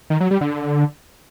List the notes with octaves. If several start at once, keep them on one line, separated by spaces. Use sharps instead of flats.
D#3
F#3
G3
D3